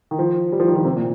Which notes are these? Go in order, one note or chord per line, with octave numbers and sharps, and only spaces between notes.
D#3
F3
G3
F3
D#3
F3
C3
A#2